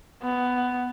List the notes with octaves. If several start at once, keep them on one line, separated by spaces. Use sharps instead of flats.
B3